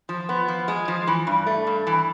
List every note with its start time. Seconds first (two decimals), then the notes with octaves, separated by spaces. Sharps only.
0.09 F3
0.29 B3
0.48 F3
0.68 G#3
0.88 F3
1.07 E3
1.27 G2
1.46 A3
1.67 G2
1.87 E3